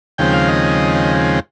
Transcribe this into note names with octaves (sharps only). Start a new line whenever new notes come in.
D#2 C#3 F3 G#3 C4 G5
F5
D#5